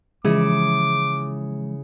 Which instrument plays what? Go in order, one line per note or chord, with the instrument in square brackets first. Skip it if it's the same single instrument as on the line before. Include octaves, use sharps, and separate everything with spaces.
[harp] C#3 E4 G#4 [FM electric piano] E3 F3 G#3 [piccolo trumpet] D6